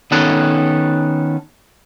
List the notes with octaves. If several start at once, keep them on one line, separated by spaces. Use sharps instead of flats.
D#3 B3 C#4 A4 B4